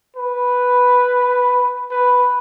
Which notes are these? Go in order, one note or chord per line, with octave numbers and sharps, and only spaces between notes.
B4
B4